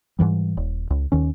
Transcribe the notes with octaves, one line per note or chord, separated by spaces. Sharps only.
G#2 B2 E3 G3
D#1
C#2
D#2 D#3 C#4